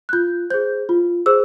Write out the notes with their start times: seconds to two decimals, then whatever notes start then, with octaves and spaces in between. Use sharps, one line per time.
0.09 F#6
0.13 F4 G6
0.50 G#4 C5 G6
0.89 F4
1.26 G#4 C5 E6